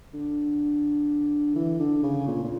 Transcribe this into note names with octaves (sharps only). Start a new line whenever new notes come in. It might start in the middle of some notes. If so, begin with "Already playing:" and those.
D3
E3
D3
C#3
A#2
A#2